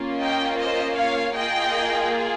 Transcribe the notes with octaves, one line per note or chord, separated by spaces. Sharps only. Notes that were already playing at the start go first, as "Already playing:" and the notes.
Already playing: A#3 C#4 F4
D#5 G5
C5 D#5
C#5 F5
A#3 F4 G#4 D#5 G5